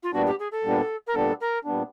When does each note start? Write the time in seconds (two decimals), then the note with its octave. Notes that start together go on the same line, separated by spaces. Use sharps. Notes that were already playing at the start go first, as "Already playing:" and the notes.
0.03 F4
0.13 A#2 G3 B3 D4 F#4
0.26 G4
0.39 G#4
0.51 A4
0.64 A#2 G3 B3 D4
1.07 A#4
1.14 A#2 G3 B3 D4 A4
1.40 A#4
1.65 A#2 G3 B3 D4